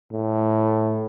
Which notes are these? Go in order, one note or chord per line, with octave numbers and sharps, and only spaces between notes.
A2